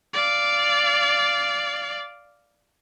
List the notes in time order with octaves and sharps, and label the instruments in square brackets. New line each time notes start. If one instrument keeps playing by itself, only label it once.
[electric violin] D5 F5